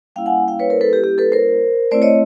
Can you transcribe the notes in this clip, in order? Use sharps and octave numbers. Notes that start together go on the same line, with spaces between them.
G3 A#3 C#4 E4 F5 G5
F#5 G#5
F5 G5
B4 C#5
A#4 C5
A4 B4
G4
G4
A4 B4
A#4 C5
A3 C4 E4 C5 D5
C#5 D#5